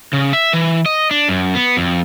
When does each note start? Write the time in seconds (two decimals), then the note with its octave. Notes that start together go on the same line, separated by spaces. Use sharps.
0.13 C#3
0.33 E5
0.53 E3
0.86 D#5
1.11 D4
1.29 F#2
1.55 B3
1.77 F2